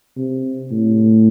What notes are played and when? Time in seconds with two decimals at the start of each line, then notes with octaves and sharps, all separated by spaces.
0.17 C3
0.72 A2